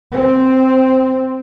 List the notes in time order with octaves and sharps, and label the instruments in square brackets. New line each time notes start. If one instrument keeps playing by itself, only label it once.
[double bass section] C4